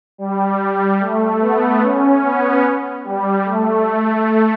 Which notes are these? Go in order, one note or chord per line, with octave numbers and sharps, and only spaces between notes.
G3
G3
A3
B3
C#4
B3
G3
A3
A3